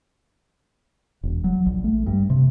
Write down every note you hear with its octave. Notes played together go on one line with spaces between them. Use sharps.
E1
F#3
A#1
A3
G2
C3